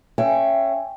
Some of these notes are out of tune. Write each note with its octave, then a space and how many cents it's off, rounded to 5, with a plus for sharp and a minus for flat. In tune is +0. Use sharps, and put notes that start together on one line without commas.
C#4 +0 E5 +20 G5 +0